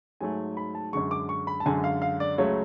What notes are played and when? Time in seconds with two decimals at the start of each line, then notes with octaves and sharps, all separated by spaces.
0.21 G#2 F#3 A3 G#5
0.57 B5
0.75 A5
0.93 F#2 D3 G#3 C#6
1.11 D6
1.29 C#6
1.47 B5
1.60 A5
1.66 F#2 D3 G#3 G#5
1.84 F5
2.02 F5
2.20 D5
2.38 C#2 C#3 F#3 A3 C#5